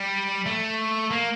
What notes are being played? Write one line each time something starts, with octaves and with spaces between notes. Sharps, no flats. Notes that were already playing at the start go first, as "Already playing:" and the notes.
Already playing: G3
A3
A#3